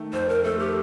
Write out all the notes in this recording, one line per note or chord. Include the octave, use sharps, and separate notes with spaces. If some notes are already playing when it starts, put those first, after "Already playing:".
Already playing: D#3 A3
F2 C5
A#4
A3 A4
G4